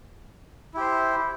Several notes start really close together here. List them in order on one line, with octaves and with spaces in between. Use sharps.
E4 G4 C5